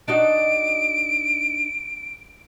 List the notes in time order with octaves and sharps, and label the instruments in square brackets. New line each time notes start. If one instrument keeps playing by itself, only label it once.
[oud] D4 D#4 F#4 [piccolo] D7